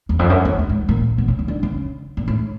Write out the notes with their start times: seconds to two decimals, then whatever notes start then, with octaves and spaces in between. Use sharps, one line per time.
0.09 E2
0.19 F2
0.30 F#2
0.45 F2
0.59 F2
0.69 G#2
0.89 A#2
1.18 B2
1.28 C#3
1.39 C#3
1.48 D3
1.63 C#3
2.17 A#2
2.28 A2